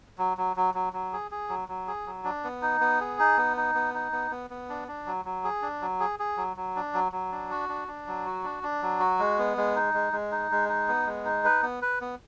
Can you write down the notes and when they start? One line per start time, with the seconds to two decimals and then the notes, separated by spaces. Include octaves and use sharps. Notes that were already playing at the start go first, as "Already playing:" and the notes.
0.18 F#3
0.37 F#3
0.56 F#3
0.74 F#3
0.93 F#3
1.13 G#4
1.31 G#4
1.49 F#3
1.68 F#3
1.87 G#4
2.06 F#3
2.24 D4
2.44 B3
2.62 D#4
2.81 B3
3.00 G#4
3.19 D#4
3.37 B3
3.57 D#4
3.75 B3
3.94 D#4
4.12 B3
4.31 B3
4.50 B3
4.69 D4
4.88 D4
5.06 F#3
5.25 F#3
5.44 G#4
5.62 D4
5.82 F#3
6.00 G#4
6.19 G#4
6.37 F#3
6.57 F#3
6.76 D4
6.94 F#3
7.12 F#3
7.32 D4
7.51 F#4
7.69 D4
7.88 D4
8.07 F#3
8.26 F#4
8.44 D4
8.63 D4
8.82 F#3
9.00 F#4
9.19 G#3
9.39 B3
9.57 G#3
9.76 D#4
9.94 G#3
10.13 G#3
10.32 D#4
10.51 G#3
10.69 D#4
10.88 B3
11.06 G#3
11.25 D#4
11.44 B4
11.63 B3
11.82 B4
12.01 B3